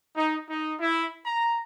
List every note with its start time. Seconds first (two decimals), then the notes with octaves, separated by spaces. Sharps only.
0.17 D#4
0.49 D#4
0.79 E4
1.26 A#5